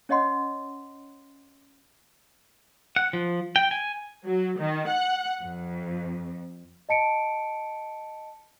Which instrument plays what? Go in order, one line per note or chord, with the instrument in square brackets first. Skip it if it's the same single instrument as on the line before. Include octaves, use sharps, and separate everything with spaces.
[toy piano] C#4 C#5 D#5 F#5 C6
[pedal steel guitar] F#5
F3
G5
G#5
[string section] F#3
D#3
F#5
F2
[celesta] D#5 A5 C#7 D7